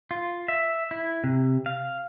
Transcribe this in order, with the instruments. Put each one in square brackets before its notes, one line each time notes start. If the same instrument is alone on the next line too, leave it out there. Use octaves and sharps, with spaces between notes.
[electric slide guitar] F4
E5
E4
C3
F5